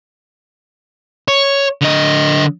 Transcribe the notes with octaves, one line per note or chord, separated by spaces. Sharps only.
C#5
D3 D#5